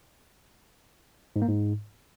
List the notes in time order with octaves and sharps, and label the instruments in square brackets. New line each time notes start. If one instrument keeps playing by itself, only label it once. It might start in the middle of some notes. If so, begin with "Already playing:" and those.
[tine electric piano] G#2
A#3
G#2